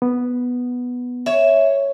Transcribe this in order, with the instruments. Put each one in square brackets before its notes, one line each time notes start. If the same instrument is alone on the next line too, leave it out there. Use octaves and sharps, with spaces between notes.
[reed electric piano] B3
[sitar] C#5 [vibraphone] E5